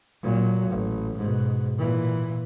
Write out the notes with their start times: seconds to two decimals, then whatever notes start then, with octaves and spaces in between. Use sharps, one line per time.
0.23 A#2 F#3
0.70 A1
1.18 G#2 B2
1.78 A#2 E3